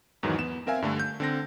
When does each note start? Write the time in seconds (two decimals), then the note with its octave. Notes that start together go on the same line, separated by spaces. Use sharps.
0.23 E2 G#2 D#3 E3 F#3
0.38 B3 E7
0.67 C4 A#4 E5 F5 G#5
0.82 G2 D3 A3
1.00 G6
1.20 D3 C4 A#6